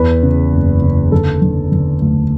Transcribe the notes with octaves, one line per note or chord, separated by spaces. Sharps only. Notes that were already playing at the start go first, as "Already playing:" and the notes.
Already playing: E2 B4
C#3
F#1
C#3
D3 A4
D3
D3
D2